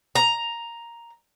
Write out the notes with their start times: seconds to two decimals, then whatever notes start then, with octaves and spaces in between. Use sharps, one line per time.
0.15 A#5